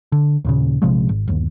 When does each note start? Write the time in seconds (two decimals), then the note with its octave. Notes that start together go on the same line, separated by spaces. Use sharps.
0.12 D3
0.45 D#2 A#2 C#3
0.82 A#1 C3 F3 G#3
1.09 G#1
1.28 G1 D#2